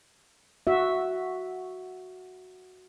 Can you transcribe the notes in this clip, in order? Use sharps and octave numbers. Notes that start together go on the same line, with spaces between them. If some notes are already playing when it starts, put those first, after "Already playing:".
F#4 E5